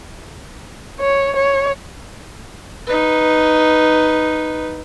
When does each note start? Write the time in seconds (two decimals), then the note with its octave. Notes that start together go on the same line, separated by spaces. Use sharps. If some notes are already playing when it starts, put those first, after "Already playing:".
1.00 C#5
1.36 C#5
2.87 D#4 B4